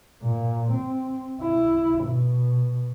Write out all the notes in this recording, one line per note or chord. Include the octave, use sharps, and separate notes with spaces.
A#2
C4
E4
B2